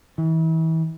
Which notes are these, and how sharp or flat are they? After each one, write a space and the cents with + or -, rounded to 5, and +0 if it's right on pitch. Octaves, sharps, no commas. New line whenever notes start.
E3 -35